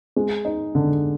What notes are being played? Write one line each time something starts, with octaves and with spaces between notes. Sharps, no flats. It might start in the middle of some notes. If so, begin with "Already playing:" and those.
G#3
D#4
D3